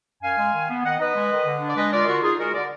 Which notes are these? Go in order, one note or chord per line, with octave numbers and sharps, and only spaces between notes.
F#2 F5 G#5
G#3
D#3
B3
D#3 D#5 F#5
D#4 B4 D#5
G#3
D#3
D3
D4
D5
G#3 B4 D#5
F4 A#4 D5
D3 F#4 A#4
D#4 F4 G#4
G#3 F#4 A#4
D3 A#4 D5